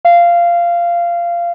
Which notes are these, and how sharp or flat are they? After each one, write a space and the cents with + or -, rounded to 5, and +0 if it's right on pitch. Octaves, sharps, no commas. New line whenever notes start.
F5 -15